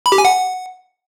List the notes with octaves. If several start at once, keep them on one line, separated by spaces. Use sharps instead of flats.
B5
G4
G#5
F#5